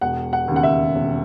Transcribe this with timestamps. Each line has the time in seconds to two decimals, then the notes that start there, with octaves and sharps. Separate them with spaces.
0.01 E1 F#5
0.33 F#5
0.48 D#2 C#3
0.56 F#5
0.63 E5
0.95 E1